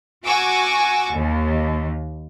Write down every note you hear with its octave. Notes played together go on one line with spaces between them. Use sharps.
F#4 F#5 G#5 C#6 D6 E6
D#2